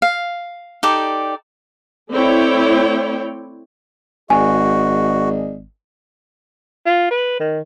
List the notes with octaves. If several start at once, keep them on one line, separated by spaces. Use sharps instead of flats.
F5
D#4 G4 A4 D5
A3 C4 E4 C#5 D5 G5
G#1 F#4 G#4 D5 D#5 G#5
F4
B4
D#3